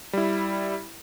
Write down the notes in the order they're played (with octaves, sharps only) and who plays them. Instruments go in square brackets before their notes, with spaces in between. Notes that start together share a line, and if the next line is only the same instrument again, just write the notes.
[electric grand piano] G3 E4